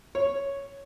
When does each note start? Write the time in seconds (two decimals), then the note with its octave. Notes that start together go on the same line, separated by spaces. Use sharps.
0.15 C#5